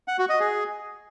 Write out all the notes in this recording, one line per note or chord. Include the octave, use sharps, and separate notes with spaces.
F#5
F#4
D#5
G#4